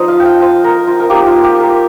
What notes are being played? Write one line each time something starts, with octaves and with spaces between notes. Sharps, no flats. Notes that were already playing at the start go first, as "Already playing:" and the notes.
Already playing: F3 D#4 C5 D#5
F5
G5
F5
C5
A#4
F4
A#4
A#3 D#4 G4
F4
G4
A#4